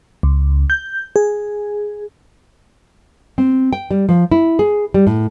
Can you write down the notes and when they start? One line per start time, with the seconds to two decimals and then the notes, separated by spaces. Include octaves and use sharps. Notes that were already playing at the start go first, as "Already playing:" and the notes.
0.23 C#2
0.70 G6
1.16 G#4
3.38 C4
3.73 G5
3.91 G3
4.09 F3
4.32 E4
4.59 G#4
4.94 G3
5.07 A2